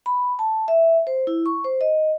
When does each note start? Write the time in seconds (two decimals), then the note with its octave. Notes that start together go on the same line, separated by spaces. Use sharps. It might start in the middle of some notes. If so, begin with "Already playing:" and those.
0.06 B5
0.39 A5
0.68 E5
1.07 C5
1.27 E4
1.46 C#6
1.64 C5
1.81 D#5